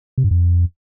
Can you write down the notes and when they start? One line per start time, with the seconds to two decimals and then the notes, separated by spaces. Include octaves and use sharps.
0.18 C3
0.24 G2
0.31 F2